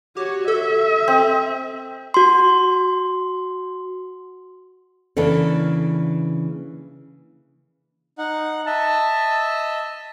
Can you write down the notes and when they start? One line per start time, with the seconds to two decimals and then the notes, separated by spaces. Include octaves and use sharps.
0.17 F#4 G4 C#5
0.48 A4 E5
1.08 C4
2.14 F#4 C6
5.17 C#3 E3 A#3 D4 A4
8.18 D#4 F#5
8.67 D#5 E5 A5